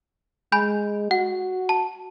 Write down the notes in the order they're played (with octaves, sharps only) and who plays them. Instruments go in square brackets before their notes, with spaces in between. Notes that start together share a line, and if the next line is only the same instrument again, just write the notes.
[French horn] G#3 [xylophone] G#5 B5 G6
[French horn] F#4 [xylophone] F#5
[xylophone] A5